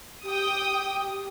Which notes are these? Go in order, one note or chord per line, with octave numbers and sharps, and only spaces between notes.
G4 G5 D#6